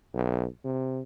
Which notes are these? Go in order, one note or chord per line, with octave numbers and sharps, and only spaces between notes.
B1
C3